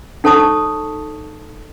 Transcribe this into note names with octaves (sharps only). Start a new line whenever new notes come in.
D#4 A4 C#5 A5 C#6 D#6